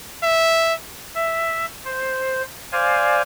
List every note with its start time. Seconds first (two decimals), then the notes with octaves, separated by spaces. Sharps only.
0.24 E5
1.15 E5
1.85 C5
2.72 C5 D5 F5 G#5